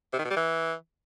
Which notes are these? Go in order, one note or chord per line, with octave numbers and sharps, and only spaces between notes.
C3
D#3
B2
G3
E3